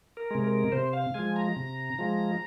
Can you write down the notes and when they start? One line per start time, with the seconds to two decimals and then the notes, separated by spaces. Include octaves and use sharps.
0.17 A#4
0.31 C3 G#3
0.44 A#4
0.72 C3 C5
0.93 F5
1.14 F3 G#3 G#5
1.36 A#5
1.57 C3
1.99 F3 G#3